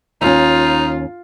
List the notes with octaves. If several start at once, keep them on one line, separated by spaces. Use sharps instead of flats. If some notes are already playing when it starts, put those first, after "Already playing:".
D#2 C#4 D#4 F4